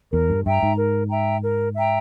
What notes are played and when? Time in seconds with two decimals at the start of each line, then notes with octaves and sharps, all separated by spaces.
0.13 E2 A#4
0.30 G2
0.46 G2 E5 G5 A#5
0.63 G#2
0.78 A#4
1.11 E5 G5 A#5
1.43 A#4
1.76 E5 G5 A#5